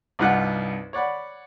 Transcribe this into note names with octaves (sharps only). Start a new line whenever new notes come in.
C2 G2 D#4 F4 F#5 F#6
C#5 D5 F#5 B5